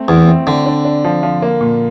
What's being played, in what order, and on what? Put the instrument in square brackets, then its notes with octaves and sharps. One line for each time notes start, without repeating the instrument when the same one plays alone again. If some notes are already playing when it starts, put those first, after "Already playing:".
Already playing: [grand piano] A3 C4
[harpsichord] E2 [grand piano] E4
[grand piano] C4
[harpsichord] D3 [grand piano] C4
[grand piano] D4
D4
F3
F3
A#3
A#2